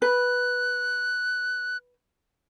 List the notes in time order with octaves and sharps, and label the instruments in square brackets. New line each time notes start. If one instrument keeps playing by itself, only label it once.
[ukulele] B4 [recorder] F#6